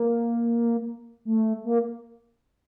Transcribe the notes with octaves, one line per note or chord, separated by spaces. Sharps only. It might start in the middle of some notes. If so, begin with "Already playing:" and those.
Already playing: A#3
A3
A#3